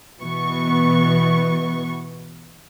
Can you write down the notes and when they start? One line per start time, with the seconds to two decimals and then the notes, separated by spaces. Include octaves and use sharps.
0.20 B2 E3 B3 C#6